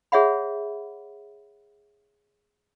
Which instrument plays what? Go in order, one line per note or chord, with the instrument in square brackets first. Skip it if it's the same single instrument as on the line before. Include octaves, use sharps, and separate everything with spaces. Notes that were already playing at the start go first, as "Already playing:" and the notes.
[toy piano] G#4 C#5 E5 F#5 B5